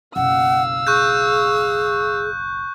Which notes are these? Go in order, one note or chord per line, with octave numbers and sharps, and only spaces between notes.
F#1 B1 F5 F#5 E6
G#4 C#6 F#6 G6